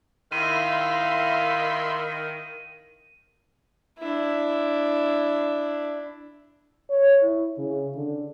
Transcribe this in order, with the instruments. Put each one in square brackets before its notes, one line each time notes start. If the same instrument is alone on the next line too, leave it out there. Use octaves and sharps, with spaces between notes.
[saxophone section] D#3 [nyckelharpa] E4 F5 [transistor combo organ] E5 B5 C6 [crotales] D#7
[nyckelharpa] D4 E4
[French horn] C#5
E4
C#3
D3